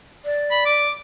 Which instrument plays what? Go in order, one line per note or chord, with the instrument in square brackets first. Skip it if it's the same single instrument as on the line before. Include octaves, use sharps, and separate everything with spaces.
[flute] D5
[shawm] B5
D6